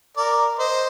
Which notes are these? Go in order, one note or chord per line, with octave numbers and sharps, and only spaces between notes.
A#4 D5
C5 D#5